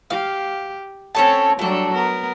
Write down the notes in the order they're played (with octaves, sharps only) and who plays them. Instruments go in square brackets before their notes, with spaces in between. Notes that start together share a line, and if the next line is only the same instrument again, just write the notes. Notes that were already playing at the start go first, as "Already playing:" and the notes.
[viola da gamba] G4 [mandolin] F5
[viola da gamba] C4 C#5 [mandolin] C#4 A4 A5
[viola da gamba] F#3 G3 D4 [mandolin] A3 A4
[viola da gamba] B3 A#4